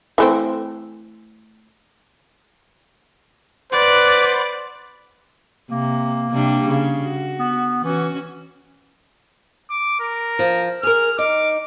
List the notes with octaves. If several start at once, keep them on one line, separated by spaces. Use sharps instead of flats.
E3 A3 C4
B4 C5 D5 F#5
C3 A#3
C3 G3 D4
C#3
F#4
B3
E3 C#4 F#4
D6
A#4
F3
G#4 A#4 F6
D#4 D6